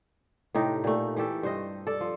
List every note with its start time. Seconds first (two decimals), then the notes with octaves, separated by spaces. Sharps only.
0.55 A2 C3 D#4 G4
0.84 A#2 A3
1.16 E3 A3 G4 A4
1.43 G2 C5 D#5
1.87 A4 D5
2.01 F3